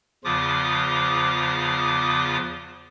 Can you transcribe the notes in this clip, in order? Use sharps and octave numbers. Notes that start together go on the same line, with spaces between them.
E2 C#3 F3 F4 D6 D#6